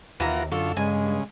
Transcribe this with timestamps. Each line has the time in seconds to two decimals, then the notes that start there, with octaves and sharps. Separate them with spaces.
0.20 D#2 E3 F4 A#4 F#5 A#5
0.52 F#2 D3 F4 A4 C#6
0.77 G2 C#3 G#3 G#5